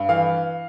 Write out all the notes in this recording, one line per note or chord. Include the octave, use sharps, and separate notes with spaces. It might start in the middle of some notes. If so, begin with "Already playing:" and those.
Already playing: G2
E3 F5